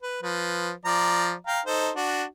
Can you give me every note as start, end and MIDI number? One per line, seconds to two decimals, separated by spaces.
0.02 0.20 71
0.22 0.71 53
0.22 0.71 71
0.85 1.33 53
0.85 1.33 74
0.85 1.33 82
1.47 1.61 77
1.47 1.61 79
1.47 1.61 82
1.66 1.91 63
1.66 1.91 69
1.66 1.91 72
1.96 2.24 62
1.96 2.24 66